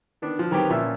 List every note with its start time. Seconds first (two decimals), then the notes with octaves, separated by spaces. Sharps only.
0.22 D#3 B3 D4
0.39 F3
0.51 D#3 F#3 B3 C4 G4 B4
0.70 A#2 F3 C#4 E5